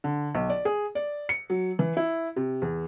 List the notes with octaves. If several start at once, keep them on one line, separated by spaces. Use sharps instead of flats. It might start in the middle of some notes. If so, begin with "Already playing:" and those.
D3
B1
D5
G#4
D5
C#7
F#3
E3
E4
C3
E2